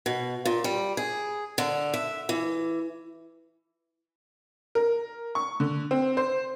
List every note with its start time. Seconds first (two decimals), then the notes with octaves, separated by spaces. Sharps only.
0.06 B2
0.45 A#2
0.64 G3
0.97 G#4
1.58 D3
1.94 E5
2.29 E3
4.75 A#4
5.35 C#6
5.60 D3
5.91 C4
6.17 C5